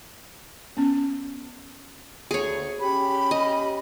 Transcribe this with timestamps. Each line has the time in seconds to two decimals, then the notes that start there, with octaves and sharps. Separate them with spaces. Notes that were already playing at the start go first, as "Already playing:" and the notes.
0.77 B3 C#4
2.31 D2 G#4 C#5
2.80 C#4 G4 B5
3.31 D#5